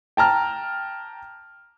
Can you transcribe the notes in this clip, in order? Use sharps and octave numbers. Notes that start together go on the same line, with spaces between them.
G5 A5 A#5 F6